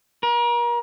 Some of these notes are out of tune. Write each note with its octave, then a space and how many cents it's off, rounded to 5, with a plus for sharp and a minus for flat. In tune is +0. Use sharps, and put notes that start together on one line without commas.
A#4 +35